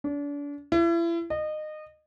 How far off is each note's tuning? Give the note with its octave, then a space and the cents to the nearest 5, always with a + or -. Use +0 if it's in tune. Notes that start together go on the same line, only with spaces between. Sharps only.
D4 -35
E4 +35
D#5 -25